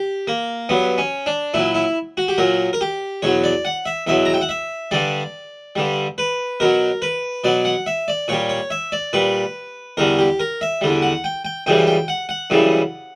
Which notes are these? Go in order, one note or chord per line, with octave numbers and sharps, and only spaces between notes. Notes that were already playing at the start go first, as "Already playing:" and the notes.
Already playing: G4
A#3
G2 F#3 B3
C#4
D4
A#2 F#3 E4
E4
F#4
G4
A#2 F#3 A#4
A#4
G4
E2 B2 F#3 C#5
D5
F#5
E5
E2 B2 F#3 E5
A#5
G5
F#5
E5
G2 D3 G3 D5
G2 D3 G3
B4
B2 F#3 A#4
B4
B2 F#3 D5
F#5
E5
D5
A#2 G3 C#5
C#5
E5
D5
A#2 G3 B4
E2 D3 G3 A#4
G4
A#4
E5
E2 D3 G3
F#5
G5
G5
F#2 C#3 E3 G3 G5
G5
F#5
F#5
F#2 C#3 E3 G3